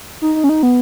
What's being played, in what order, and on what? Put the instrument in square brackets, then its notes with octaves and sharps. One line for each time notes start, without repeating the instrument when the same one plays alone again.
[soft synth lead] D#4
D#4
C#4
D#4
B3